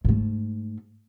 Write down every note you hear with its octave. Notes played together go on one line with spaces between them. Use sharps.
G#2 A3